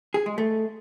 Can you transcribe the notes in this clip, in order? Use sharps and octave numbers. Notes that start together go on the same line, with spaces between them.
G#4
G#3
A3